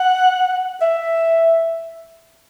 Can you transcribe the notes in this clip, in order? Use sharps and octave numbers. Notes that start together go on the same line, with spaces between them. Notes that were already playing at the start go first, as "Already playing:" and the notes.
Already playing: F#5
E5